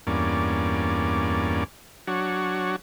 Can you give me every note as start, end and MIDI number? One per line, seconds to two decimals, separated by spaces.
0.07 1.64 40
0.07 1.64 43
0.07 1.64 58
0.07 1.64 61
0.07 1.64 74
2.08 2.76 54
2.08 2.76 62
2.08 2.76 66
2.08 2.76 73